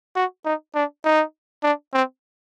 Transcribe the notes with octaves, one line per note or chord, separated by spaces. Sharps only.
F#4
D#4
D4
D#4
D4
C4